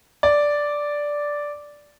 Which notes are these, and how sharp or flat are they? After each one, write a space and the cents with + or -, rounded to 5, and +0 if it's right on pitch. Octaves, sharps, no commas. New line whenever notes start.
D5 -5